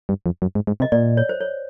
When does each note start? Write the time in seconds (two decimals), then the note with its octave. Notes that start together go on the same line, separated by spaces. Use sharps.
0.09 G2
0.26 F2
0.42 F#2
0.55 G#2
0.67 G#2
0.80 C3 D#5
0.92 A#2 D5
1.17 C#5
1.29 C5
1.40 C#5